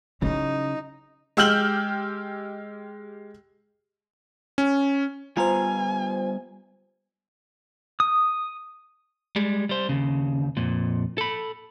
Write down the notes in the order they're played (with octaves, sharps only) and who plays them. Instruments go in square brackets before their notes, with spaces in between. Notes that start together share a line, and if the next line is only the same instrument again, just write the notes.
[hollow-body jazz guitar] C#3 [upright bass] F#3 E4 [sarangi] D#4
[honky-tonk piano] G#3 G4 E6 F6 G6 F#7
[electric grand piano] C#4
[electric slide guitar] G3 B3 A#5 [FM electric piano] F4 C5 [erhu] G#5
[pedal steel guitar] D#6
[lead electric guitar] G3 G#3
G3 C5
D#2 C#3
F2 A#2
A4 B5